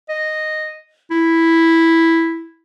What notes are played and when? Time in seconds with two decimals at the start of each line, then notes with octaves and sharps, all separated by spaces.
0.09 D#5
1.11 E4